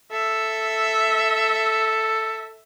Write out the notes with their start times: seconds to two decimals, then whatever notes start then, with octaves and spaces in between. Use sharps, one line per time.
0.12 A4 E5